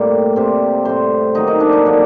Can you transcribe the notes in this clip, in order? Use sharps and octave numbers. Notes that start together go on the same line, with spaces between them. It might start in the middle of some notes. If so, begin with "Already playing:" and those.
Already playing: A2 G3 A#3 C4 G5
C3 G3 C4
A2 G3 C4 C5
D#3 F#3 A#3 D#4
D#4
D4
D#4
D3 F#3 A#3 D4